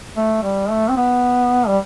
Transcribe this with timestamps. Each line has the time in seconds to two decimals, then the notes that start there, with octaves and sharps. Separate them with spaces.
0.16 A3
0.43 G3
0.70 A3
0.89 C4
0.97 B3
1.67 G3